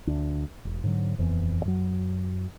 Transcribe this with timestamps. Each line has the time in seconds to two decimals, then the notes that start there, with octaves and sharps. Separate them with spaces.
0.07 D2 D4
0.65 E1
0.83 G#2 D3 F#3
1.18 D#1 F2 E3 B3
1.65 F#2 F#3